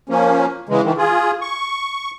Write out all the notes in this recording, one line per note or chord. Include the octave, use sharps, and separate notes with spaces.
F3 A#3 C#4
C#3 E3 G#3
D#3 E3
F4 G#4
C#6